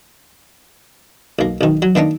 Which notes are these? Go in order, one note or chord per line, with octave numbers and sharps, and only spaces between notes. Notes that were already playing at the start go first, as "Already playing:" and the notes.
B1 A#3
B1 D#3
F#3
D#3 A#3 D4 D#4